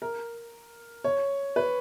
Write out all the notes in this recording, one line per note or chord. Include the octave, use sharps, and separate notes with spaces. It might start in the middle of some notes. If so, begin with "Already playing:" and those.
A#4
C#5
B4